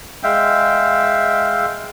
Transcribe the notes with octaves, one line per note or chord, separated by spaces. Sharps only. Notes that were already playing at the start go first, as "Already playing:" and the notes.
G#3 E5 F5 G5